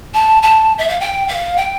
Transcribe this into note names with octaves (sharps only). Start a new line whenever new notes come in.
A5
A5
E5
F5
G5
F5
G5